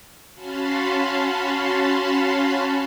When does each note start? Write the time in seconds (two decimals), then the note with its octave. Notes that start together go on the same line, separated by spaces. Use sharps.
0.34 C#4 F#4 F5 A5 B5 C6